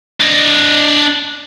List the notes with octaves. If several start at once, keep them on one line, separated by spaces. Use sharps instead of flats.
D4 D#5